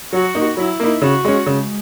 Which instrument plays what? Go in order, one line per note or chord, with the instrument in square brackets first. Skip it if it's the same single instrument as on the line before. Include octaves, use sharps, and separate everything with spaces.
[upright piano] F#3 [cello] F#4
[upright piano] A#3 D#4
[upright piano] F#3 [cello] E4
[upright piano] A#3 D#4
[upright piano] C#3 [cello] F#4
[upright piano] G#3 C#4
[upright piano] C#3 [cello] G#3